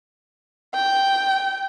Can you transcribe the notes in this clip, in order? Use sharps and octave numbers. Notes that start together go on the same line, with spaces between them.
G5